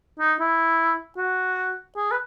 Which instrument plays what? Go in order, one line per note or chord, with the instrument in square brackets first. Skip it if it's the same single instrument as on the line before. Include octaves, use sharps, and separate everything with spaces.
[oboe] D#4
E4
F#4
G#4
B4